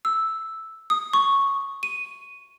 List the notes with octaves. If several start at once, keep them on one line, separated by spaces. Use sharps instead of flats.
E6
D#6
C#6
D#7